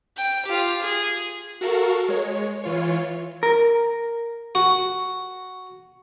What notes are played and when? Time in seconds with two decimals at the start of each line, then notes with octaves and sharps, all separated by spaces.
0.17 G5
0.46 F4 G4
0.81 G#4
1.61 F#4 A4 A#4 F5 C#6
2.08 G#3 C#5
2.64 E3 F4 C#5
3.43 A#4
4.55 F#4